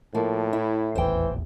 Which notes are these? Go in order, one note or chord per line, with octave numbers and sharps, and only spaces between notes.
A2 F3 A#3
E4
D#1 A1 E2 E3 C5 G5